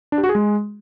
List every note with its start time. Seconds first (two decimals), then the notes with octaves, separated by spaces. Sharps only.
0.12 D4
0.18 G4
0.24 F#4
0.29 G#4
0.35 G#3